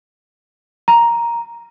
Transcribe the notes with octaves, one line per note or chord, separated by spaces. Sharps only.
A#5